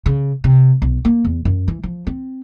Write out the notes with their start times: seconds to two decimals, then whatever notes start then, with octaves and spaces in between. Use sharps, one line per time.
0.06 C#3
0.44 C3
0.82 B1
1.05 A#3
1.25 E2
1.45 F#2
1.68 E3
1.83 F3
2.07 C4